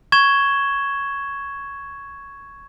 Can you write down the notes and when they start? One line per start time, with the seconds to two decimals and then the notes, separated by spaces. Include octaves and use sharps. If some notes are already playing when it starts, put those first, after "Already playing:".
0.12 C#6 G#6 E7 G7